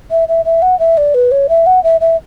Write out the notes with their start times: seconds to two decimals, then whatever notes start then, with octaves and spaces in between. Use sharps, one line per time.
0.11 E5
0.28 E5
0.45 E5
0.62 F#5
0.79 E5
0.98 D5
1.14 B4
1.31 C#5
1.49 E5
1.66 F#5
1.84 E5
2.01 E5